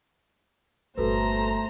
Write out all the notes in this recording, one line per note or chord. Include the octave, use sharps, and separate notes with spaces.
G1 A#2 A3 F#4 A4 B4 C5 A#5